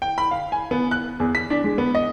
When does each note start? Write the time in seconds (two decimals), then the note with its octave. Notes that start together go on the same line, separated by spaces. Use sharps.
0.02 G5
0.18 B5
0.31 F5
0.52 G#5
0.71 B3
0.91 F#6
1.20 E2
1.35 B6
1.50 D4
1.64 G#3
1.78 B3
1.95 D#5